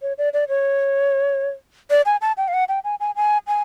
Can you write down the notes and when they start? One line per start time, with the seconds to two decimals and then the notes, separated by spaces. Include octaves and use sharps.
0.02 C#5
0.18 D5
0.33 D5
0.49 C#5
1.91 D5
2.06 G#5
2.21 A5
2.37 G5
2.48 F5
2.53 F#5
2.69 G5
2.84 G#5
3.00 G#5
3.16 G#5
3.48 G#5